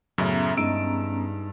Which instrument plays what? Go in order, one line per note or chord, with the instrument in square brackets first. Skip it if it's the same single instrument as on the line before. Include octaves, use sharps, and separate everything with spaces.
[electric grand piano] F#2 C#3 F#3 [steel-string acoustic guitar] A2 E5 [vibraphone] B3 C#4 A#5
[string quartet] G2 [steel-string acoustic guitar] G#3 D#4 [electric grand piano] E6 D7